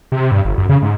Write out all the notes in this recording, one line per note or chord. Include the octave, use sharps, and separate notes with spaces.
C3
G2
G1
F#2
C#3
G#2